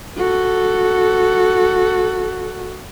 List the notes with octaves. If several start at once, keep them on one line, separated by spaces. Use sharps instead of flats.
F#4 A4